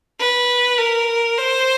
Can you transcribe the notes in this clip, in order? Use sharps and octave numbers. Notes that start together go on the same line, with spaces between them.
B4
A#4
C5